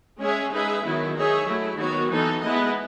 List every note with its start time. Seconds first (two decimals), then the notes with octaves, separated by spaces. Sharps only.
0.20 G#3 C#4 G#4 C#5 E5
0.51 G#3 D#4 G#4 B4 E5
0.83 D#3 F#3 B3 E4
1.15 D#4 G#4 C#5 E5
1.47 F#3 A3 E4
1.78 D#3 F#3 B3 F#4 C#5
2.11 E3 B3 D#4 A4
2.42 G#3 B3 E4 B4 D#5